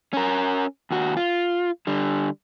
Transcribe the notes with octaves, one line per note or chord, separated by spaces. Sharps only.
C#4 A#4
D#2 F#4
F4
D3 G3